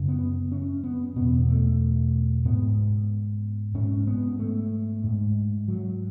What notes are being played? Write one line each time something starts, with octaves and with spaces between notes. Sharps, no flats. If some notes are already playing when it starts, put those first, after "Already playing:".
Already playing: F#2 C#3
B3
C#4
B3
E2 B2 B3
A3
G#2 B3
G#2 C#4
B3
A3
G#2
F#3